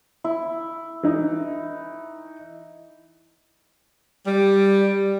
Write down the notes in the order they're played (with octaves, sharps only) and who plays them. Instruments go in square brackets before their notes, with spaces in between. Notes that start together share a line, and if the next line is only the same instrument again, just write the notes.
[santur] E4
[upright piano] E3 D#4
[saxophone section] G3